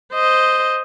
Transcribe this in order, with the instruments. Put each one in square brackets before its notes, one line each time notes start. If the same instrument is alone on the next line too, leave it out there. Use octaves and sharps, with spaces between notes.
[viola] C5 D#5